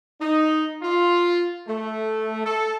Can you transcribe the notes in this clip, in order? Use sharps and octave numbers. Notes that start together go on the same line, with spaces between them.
D#4
F4
A3
A4